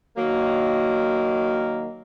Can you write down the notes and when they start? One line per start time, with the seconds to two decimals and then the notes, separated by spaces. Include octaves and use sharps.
0.17 D#3 F#3 A#3